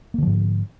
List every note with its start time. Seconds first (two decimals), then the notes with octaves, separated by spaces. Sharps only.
0.14 A#3
0.18 D3
0.23 F3
0.27 G#2